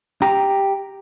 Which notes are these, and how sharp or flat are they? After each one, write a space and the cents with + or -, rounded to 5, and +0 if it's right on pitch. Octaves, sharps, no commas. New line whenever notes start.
G4 +0 A#5 +0